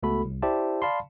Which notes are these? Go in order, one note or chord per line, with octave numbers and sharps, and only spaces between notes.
C#2 A3 B3 F#4 A4 B5
C2
E4 G4 C5 D5 E5 A5
D5 F5 A5 B5 C6